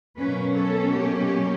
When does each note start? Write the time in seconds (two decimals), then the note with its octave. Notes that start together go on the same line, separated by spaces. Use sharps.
0.19 B2 F#3 A#3 C#4 B4
0.58 A4
0.96 G4